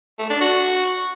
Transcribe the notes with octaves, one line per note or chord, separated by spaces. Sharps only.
A3
D4
F#4